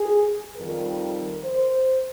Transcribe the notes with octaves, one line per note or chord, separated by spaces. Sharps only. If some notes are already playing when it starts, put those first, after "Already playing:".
Already playing: G#4
F2 D#3 G3 A#4
C5